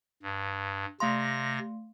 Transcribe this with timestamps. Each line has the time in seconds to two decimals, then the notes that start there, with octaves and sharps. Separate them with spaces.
0.23 G2
1.00 C3 A3 F5 C6 A#6